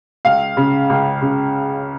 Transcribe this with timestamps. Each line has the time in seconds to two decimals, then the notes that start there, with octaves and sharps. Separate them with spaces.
0.25 C#2 F5
0.57 C#3
0.90 C#2
1.21 C#3